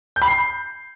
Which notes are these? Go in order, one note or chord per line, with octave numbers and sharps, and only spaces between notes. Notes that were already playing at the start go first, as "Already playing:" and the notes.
G6
B5
C7